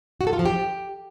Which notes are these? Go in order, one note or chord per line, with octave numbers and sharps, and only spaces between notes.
F#4
A4
F4
F3
G4